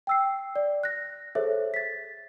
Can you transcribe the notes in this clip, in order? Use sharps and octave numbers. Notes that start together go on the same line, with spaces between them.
G5 E6 C7
D5
F#6 A#6
G#4 A4 C5 C#5 E5
A6 B6